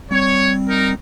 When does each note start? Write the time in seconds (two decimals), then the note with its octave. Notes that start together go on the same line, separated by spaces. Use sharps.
0.11 G3 C4 C#5
0.68 D#4 A#4